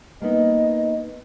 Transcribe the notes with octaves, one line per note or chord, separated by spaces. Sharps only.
A#3 B3 D#4 D#5